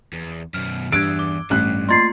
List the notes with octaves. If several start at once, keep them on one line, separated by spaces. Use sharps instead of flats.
E2
F#2 B2 F6
E2 G2 E6 F#6 G#6 D7
D6
A1 G2 F#6
A3 A#3 F4 C6 A6 C7